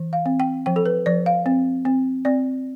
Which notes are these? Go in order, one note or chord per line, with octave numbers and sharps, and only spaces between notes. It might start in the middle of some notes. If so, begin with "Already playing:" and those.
Already playing: E3
F5
C4
G5
F3 G5
A4
B4
F3 D5
F5
C4
C4
C4 D5